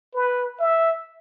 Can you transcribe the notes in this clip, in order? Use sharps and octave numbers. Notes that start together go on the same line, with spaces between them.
B4
E5